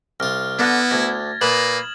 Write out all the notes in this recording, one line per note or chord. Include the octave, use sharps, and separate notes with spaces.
C2 F4 F6
D3 B3 E4 F6 A6 A#6
D2 G#6 A#6
A#2 A#3 B4 D#6 E7 F#7